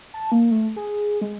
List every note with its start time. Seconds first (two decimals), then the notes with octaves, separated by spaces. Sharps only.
0.14 A5
0.32 A#3
0.51 A3
0.76 G#4
1.21 G#3